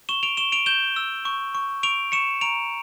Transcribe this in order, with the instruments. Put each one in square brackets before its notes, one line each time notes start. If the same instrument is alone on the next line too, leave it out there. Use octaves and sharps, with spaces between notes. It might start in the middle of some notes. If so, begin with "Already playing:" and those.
[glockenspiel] C#6 E7 G7
D7 F7
C#6 E7 G7
D7 F7
G6 E7 G7
E6
C#6
C#6
C#6 D7 F7
C#6 C#7 E7
A#5 D7 F7